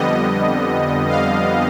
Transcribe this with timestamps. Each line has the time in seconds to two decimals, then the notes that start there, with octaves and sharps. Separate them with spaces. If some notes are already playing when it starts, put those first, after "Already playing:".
Already playing: F2 D3 G3 B3 D#5
1.09 F5